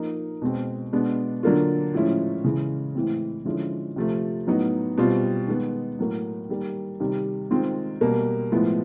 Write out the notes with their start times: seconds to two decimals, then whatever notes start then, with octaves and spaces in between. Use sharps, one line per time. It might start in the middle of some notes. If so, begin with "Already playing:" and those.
Already playing: F3 A#3 D#4
0.42 B2 G#3 C4
0.92 B2 G#3 B3 D4
1.43 D3 F#3 A#3 D4 F4
1.94 A2 F3 G#3 C#4 E4
2.44 C#3 E3 G#3
2.95 A2 E3 G#3 C4
3.45 D3 F3 G#3 C#4 E4
3.96 C3 F3 A3
4.47 A2 F#3 B3 D#4
4.97 B2 G3 C4 F4
5.48 D#3 G#3 B3
5.99 A2 F#3 A#3
6.49 D#3 G3 A#3
7.00 C3 D#3 G3
7.51 D#3 G#3 C4 F4
8.01 B2 G3 A#3
8.52 A2 F3 G#3 B3 E4